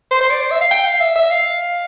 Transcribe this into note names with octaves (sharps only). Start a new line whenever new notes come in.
C5
C5
D5
C5
E5
F5
G5
F5
E5
E5
F5